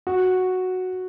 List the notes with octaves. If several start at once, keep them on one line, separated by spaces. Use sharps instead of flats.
F#4